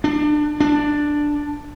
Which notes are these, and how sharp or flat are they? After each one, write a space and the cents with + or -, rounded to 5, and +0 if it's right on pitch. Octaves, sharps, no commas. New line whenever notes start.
D4 +25
D4 +5